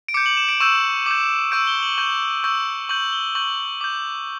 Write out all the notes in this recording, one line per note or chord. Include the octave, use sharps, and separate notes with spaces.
D7
D6 G6 C#7
F#7
E7
D7
C#6 E6 G6 E7
D6 G6
C#6 E6 G6 D7
G7
F#7
C#6 G6
C#6 E6 G6
C#6 G6 F#7
G7
C#6 G6 F#7
D6 G6